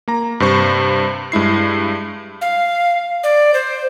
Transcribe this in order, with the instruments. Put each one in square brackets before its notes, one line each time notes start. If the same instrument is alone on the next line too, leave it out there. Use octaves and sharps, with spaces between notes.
[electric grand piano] A#3 A#5
G2 C3 C5 C#6
G2 G#3 E4 C7
[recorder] F5
D5
C5